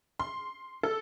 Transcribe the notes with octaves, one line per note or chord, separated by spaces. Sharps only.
C6
A4